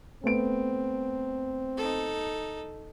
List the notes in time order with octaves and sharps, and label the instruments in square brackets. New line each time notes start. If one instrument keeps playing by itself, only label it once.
[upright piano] A3 B3 D7 [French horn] C4
[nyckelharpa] D#4 A4